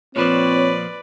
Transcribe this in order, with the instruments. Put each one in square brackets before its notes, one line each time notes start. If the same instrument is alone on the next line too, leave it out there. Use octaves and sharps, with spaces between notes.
[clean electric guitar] A#2 F3 [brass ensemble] C4 C#5 [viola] B4 D5